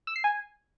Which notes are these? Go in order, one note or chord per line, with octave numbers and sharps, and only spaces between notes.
E6
C7
G#5